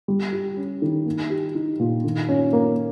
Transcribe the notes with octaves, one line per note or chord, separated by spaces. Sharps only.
G3
G4
C#4
D#3
A#3
G4
D#4
A#2
D#3
C#4
A#3